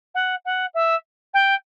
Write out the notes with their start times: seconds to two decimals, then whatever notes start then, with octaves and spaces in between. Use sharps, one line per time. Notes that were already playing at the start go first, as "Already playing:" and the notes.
0.14 F#5
0.45 F#5
0.74 E5
1.33 G5